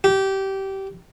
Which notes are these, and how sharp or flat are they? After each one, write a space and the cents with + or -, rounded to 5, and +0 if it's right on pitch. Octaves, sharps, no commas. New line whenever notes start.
G4 -20